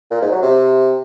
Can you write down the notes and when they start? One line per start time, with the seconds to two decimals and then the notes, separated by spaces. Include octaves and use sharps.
0.11 A#2
0.21 G#2
0.32 F#3
0.42 C3